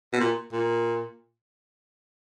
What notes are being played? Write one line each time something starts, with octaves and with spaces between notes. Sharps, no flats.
B2
A#2
A#2